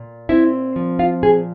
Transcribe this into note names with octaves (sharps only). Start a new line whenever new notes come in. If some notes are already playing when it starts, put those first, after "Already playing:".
Already playing: A#2
C4 E4 E5
F3
F4 F5
A#2 G#4 G#5